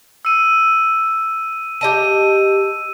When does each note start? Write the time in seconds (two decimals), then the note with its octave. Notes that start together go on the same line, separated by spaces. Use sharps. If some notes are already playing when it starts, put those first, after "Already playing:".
0.25 E6 D#7
1.81 G4 D#5 A5 D#7